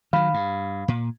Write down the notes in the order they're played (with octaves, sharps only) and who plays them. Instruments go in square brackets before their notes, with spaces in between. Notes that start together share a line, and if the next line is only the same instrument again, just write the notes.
[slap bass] D#3 F#3 [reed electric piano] F5 B5
[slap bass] G2
A#2